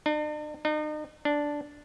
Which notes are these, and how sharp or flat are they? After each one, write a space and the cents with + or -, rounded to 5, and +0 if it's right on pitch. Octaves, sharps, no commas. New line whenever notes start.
D4 +45
D#4 -40
D4 -5